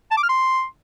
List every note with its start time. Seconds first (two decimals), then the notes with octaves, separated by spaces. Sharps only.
0.11 A5
0.17 D6
0.23 F6
0.29 C6